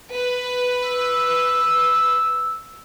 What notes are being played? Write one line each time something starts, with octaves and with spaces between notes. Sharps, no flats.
B4
E6